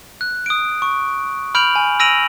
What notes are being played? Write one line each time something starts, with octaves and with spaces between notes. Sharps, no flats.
F#6
D#6 D7
C#6
B5 F6 G6 D7 F7 F#7
G#5
E6 A#6 D7 D#7 F7 F#7